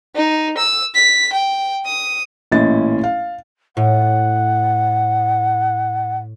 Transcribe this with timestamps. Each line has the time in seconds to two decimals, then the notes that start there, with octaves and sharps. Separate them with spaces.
0.16 D#4
0.58 E6
0.95 B6
1.33 G5
1.86 D#6
2.52 A1 A#2 C#4 E4 D#5 A6
3.04 F5
3.77 A2 F#5